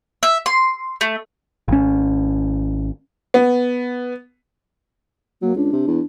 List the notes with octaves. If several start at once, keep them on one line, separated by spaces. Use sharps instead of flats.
E5
C6
A3
G#1 C#4
B3
F#3 A#3
C#2 D4
C3
E2